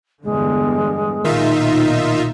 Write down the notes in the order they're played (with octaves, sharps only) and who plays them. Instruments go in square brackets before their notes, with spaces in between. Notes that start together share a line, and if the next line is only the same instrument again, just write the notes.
[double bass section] E2 G2 D3 [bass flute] G#3
[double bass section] B1 A#2 [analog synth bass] D#3 [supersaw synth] D#4 F4 E5